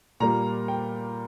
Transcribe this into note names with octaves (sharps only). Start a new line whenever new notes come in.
A#2 G3 A#3 A#5
G5